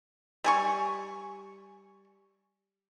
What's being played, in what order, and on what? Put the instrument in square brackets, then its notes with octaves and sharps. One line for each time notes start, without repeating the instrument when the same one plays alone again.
[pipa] G3 G#5 C#6